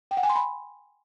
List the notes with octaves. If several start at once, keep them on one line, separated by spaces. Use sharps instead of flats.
G5
F#5
G#5
C6
B5